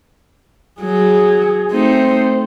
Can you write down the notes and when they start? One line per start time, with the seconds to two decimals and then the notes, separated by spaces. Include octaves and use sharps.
0.81 F#3 G#4
1.71 A3 C4 D#4 C5